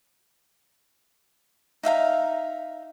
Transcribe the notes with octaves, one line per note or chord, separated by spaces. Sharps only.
D#4 E5 F5 A#5